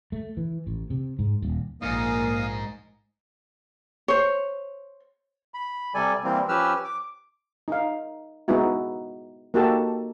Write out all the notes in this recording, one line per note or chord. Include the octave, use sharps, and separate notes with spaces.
A3
E3
A1
C3
G#2
D#1
A#1 G#2 A#3 D#5 F5 D#6
C5 C#5
B5
C3 G3 A4 D5 G#5
E3 G3 A#3 C4
F3 C#4 G4 B4 E6 F6
D6
D#4 F5
G#3 B3 D#4 E4 F#4
A#3 D#4 F#4 G4 A4 A5